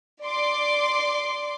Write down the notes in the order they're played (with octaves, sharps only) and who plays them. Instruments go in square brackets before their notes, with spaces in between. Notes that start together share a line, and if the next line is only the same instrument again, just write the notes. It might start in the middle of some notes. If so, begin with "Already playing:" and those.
[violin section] D5 C6 D6